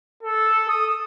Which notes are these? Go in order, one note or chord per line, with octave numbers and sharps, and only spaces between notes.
A4
D#6